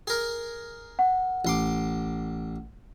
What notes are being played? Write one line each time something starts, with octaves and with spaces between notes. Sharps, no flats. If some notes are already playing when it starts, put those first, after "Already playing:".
G#4 A#4
F#5
A1 C6 D6